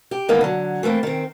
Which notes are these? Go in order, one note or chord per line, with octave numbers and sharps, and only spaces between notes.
G4
G#2 D#3 E3 A#3 B3 D#4
D3 F#3
E3 A3 A#3 C4
D#3 C4